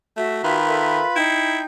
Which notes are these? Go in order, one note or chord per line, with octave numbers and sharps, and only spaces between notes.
A3 F#4 E5
D#3 F4 B4 B5
A4 A#4 E5
D#4 E4 G5 G6